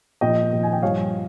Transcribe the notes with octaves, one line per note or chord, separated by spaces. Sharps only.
A#2 F3 D#5 G5
A#2 F3
G#5
G5
G2 F3 C#5 F5